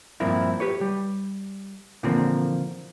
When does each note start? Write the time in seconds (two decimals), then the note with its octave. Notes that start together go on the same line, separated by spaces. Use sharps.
0.20 G2 A#2 F3 A#3 C4 E4
0.60 G4 B4 C#5
0.81 G3
2.03 A#2 D3 E3 F3 A#3 C4